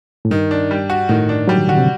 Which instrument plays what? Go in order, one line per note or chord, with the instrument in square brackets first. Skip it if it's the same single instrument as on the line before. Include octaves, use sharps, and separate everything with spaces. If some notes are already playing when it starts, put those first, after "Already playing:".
[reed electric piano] A2
[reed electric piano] G2 [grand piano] D#3
[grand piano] D4
G3
F#4
[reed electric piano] A2 [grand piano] D#3
[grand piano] D4
[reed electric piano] F#3 [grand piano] G3
[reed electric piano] D#3
[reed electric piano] D3 [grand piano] F#4
[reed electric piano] C3